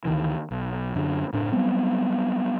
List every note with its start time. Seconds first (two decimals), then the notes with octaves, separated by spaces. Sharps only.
0.05 D2 D#3 E3
0.51 B1
0.95 F#2 D3 D#3 F#3
1.33 F#1 A2 D4
1.52 F#3 G3 B3 C4